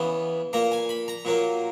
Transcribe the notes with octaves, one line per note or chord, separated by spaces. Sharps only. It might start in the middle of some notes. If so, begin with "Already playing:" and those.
Already playing: C#3 E3 B3
A#2 A#3 A#5
G#5
B5
A#5
A#2 F#3 A#3